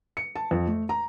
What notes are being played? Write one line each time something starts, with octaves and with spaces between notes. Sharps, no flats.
C#7
A5
F2
A3
A#5